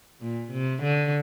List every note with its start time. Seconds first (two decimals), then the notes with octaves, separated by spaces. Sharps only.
0.21 A#2
0.52 C3
0.83 D3